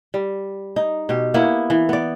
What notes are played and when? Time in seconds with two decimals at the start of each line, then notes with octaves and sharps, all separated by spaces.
0.14 G3
0.76 D#4
1.09 B2 G4
1.34 A#3 B3 E4
1.70 E3
1.89 B3 D5